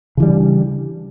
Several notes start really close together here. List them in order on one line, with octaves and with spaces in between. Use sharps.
C#3 E3 G3 D4